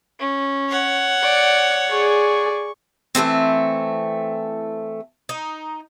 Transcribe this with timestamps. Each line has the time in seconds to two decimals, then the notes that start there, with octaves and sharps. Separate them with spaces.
0.19 C#4
0.69 C#5 F#5
1.22 D5
1.90 G#4 D5 C#6
3.15 E3 G#3 A3 C4
5.29 D#4